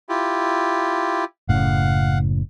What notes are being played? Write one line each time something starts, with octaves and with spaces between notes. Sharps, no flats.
E4 F4 G4
F#1 A2 C#3 F5 F#5